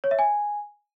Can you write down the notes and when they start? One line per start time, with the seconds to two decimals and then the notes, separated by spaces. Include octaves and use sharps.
0.04 C#5
0.11 E5
0.19 G#5